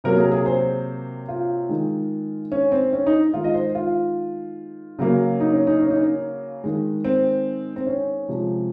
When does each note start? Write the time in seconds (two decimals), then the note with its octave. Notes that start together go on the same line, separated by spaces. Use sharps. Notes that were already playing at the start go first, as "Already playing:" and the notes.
0.04 C3 F#3 A#3 A#4
0.18 G#4
0.32 G#4
0.46 C5
1.29 F4
1.69 D#3 G#3
2.52 C#4
2.72 C4
2.93 C#4
3.06 D#4
3.34 D#3 G#3 F4
3.44 D#5
3.54 C5
3.75 F4
4.99 C#3 F#3 A#3
5.40 D#4
5.53 C#4
5.67 D#4
5.81 C#4
5.90 D#4
6.01 C#4
6.64 D#3 G#3
7.05 C4
7.76 C4
7.87 C#4
8.28 C3 F3 G#3